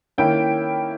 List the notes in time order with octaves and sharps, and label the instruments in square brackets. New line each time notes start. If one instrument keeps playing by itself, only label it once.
[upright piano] D#3 A#3 C#4 E4 G5